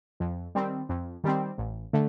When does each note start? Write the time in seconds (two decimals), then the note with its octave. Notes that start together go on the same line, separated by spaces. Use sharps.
0.20 F2
0.55 D#3 G3 C4
0.89 F2
1.24 D#3 G3 C4
1.58 A1
1.93 D3 A3